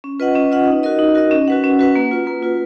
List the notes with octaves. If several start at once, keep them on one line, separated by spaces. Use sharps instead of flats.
C#4
F4 B4 D#5 F#5
C#4
F4 B4 D#5 F#5
D#4
F#4 A#4 D#5
D#4
F#4 A#4 D#5
C#4
F#4 B4 F#5
C#4
F#4 B4 F#5
A#3
F4 B4
A#3
F4 B4